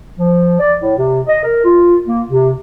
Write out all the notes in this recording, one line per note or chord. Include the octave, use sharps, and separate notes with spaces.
F3
D5
A2
C3
D#5
A#4
F4
A#3
C3